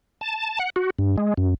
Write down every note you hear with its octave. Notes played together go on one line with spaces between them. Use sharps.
A5
F#5
F#4
G2
G#3
F#2